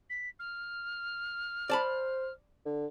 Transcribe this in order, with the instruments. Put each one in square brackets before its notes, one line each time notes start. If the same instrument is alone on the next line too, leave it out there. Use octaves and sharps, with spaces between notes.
[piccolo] B6
F6
[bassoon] C5 [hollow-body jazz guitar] D5 A5 B5
[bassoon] D3